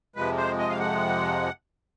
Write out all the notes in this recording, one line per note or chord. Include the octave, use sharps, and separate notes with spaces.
F2 C3 F3 G#3 B4
C5
D#5
F5
F#5